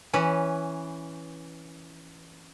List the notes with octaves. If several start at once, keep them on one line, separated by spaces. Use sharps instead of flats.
E3 C#4 B4